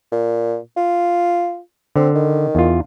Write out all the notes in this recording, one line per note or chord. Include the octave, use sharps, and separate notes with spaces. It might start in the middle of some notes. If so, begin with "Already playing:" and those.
A#2
F4
D3 C4
D#3
E2 F4